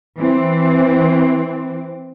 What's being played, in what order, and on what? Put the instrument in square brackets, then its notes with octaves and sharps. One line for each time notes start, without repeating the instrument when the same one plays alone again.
[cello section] E3 C4